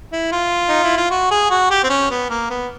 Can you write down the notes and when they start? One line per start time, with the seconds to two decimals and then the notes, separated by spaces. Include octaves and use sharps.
0.12 E4
0.32 F4
0.69 D#4
0.84 E4
0.97 F4
1.10 F#4
1.31 G#4
1.50 F#4
1.70 G4
1.84 C4
1.89 C#4
2.10 B3
2.30 A#3
2.50 B3